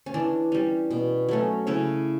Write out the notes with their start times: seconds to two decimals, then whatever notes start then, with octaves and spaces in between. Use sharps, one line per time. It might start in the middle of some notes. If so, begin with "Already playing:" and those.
0.06 C#4
0.14 E3 D4
0.52 G3 C#4
0.91 B2
1.29 F#3 A3 C#4
1.67 C#3 C#4 E4